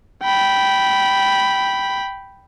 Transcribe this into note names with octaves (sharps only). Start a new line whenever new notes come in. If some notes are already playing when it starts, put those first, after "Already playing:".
G5 B5